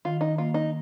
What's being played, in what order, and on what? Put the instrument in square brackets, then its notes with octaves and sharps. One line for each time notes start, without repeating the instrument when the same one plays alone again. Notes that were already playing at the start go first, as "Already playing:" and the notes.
[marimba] D#3 [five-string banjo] F4
[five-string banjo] D#4
[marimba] A#3 [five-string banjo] F4
[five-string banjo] D#4